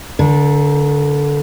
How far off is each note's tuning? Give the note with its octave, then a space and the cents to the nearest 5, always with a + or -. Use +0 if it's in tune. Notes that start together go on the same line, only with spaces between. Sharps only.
D3 -20 A#4 +25